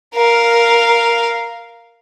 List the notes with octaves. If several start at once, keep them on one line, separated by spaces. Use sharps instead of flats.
A#4 F5